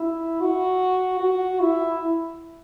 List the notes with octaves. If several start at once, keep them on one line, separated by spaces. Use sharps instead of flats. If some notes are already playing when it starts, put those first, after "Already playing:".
Already playing: E4
F#4
F#4
E4